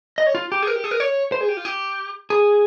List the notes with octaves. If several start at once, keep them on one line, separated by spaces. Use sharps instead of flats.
D#5
C#5
F4
G4
G#4
A#4
G4
G#4
A#4
C#5
C5
G#4
G4
F4
G4
G#4